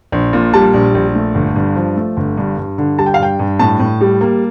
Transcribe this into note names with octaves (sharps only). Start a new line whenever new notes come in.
A#1
A#2
G3 A5
A#1
A#1
A3
G1
G2
F3
A3
G1
G2
G2
D3
G3 A5
G5
F5
G2 G5
G2
A2 A5
A2
G3
A#3